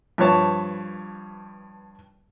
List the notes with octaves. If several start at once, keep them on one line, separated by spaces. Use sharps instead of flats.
G2 F3 B4 C#5 A5